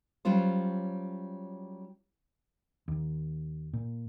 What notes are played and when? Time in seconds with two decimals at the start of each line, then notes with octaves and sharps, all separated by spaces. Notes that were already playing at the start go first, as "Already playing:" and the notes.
0.25 F#3 G3 C#4 F4 C5
2.88 D#2
3.73 A#2